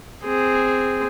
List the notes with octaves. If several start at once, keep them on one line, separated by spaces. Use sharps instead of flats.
C4 G#4